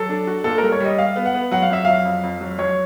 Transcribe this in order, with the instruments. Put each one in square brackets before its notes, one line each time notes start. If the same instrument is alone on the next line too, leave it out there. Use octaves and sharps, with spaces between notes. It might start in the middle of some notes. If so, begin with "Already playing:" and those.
Already playing: [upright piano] F#3 [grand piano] A4
[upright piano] D4
F#4
[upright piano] A#2 [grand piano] A4
[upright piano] G3 [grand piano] A#4
[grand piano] C#5
[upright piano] G3 [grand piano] D#5
[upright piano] G3 [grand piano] F5
[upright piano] B3
[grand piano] F#5
[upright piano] B3
[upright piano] F#3 [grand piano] F#5
[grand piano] F5
[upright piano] F2 [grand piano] E5
[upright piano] F#3 [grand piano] F5
[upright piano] F2
F2
F#3
[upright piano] F#3 [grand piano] C#5